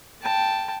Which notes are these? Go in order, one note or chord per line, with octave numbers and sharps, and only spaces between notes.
G5 A5